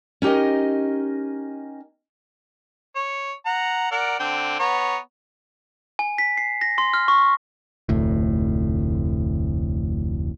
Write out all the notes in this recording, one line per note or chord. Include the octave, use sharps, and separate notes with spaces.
C#4 D#4 G4 A#4 D#5
C#5
F#5 A#5
A#4 D5 F#5
D3 C4 G5
B3 C#5 A#5
G#5
B6
C7
A#6
C6
F6
C#6
F1 D2 A2